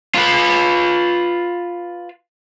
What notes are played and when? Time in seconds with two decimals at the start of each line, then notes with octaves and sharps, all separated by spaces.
0.15 F4 B4